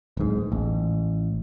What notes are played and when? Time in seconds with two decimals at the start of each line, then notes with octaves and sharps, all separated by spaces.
0.17 D1 G#2
0.52 A1